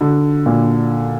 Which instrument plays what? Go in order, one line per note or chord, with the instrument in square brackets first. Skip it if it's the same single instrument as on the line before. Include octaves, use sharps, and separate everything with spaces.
[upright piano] D3
A#2